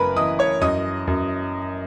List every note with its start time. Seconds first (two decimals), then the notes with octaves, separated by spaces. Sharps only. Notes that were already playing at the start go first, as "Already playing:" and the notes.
Already playing: F#1 F#2 A#4 B4 G#5 A#5 B5
0.16 E3 D#5 D#6
0.39 C#5 C#6
0.61 F#2 D#5 D#6
1.07 F#2